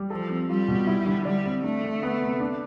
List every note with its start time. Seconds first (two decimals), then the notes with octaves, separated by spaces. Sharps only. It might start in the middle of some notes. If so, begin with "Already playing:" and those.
Already playing: G3
0.10 F3 A4
0.30 C4
0.49 G3 F4
0.68 B2
0.87 E4
1.07 D3
1.25 G3 D5
1.45 C4
1.64 A3 D4
1.83 D3
2.03 B3
2.21 C3
2.40 D4